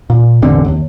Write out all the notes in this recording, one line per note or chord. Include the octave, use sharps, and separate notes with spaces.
A#2
E1 A1 D3 C4
D#1 D#2